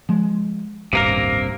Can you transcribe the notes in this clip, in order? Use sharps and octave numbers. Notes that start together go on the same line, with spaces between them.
F3 G#3
D#1 A1 G2 C3 A#3 A#4